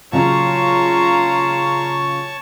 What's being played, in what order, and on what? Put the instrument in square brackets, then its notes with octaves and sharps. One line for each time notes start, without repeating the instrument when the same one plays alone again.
[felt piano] A#2 C#3 F#3 [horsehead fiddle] F4 A#5 [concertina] C#5 A5 C#6